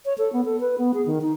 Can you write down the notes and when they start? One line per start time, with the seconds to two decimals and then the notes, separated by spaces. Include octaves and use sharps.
0.05 C#5
0.18 A4
0.33 B3
0.45 A4
0.61 B4
0.78 B3
0.94 G#4
1.06 D#3
1.21 D#4